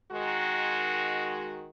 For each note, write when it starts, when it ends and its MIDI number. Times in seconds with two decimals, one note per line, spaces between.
0.11 1.69 51
0.11 1.69 56
0.11 1.69 66